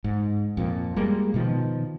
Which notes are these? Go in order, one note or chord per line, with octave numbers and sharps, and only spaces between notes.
G#2
F2 A#2
G3 G#3 A#3
B2 D#3 F3